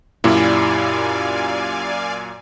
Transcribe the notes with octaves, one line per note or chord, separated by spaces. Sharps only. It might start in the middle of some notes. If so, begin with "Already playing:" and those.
F#2 A#2 E4 G4 D5 F5 G#5